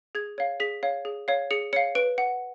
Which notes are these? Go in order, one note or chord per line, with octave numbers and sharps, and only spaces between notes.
G#4 G#6
C#5 F5
G#4 B6
C#5 F5
G#4
C#5 F5
G#4 C#7
C#5 F5 C#7
B4 D7
F#5